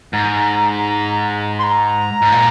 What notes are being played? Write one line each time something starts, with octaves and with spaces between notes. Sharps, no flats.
G#2 A#5
C6
A#5
G#2
A#2